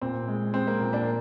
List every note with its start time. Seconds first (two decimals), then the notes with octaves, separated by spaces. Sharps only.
0.01 A#2 C4
0.28 G#3
0.54 G#3 C4
0.67 A#3
0.80 A#2
0.93 A#3 D4